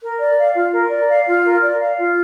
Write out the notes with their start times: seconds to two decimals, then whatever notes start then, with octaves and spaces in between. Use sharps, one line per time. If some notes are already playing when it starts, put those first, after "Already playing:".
0.02 A#4
0.20 D5
0.38 F5
0.56 F4
0.74 A#4
0.91 D5
1.10 F5
1.27 F4
1.45 A#4
1.62 D5
1.80 F5
1.97 F4